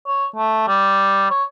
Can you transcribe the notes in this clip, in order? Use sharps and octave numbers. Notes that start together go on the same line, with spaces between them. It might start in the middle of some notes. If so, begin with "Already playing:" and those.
C#5
A3
G3
C#5